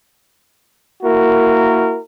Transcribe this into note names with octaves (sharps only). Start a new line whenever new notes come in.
A#3 E4 F#4 A#4